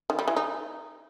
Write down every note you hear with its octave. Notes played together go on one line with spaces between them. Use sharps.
D#3
G3
E3
D#4